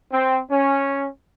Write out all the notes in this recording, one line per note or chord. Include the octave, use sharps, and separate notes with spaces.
C4
C#4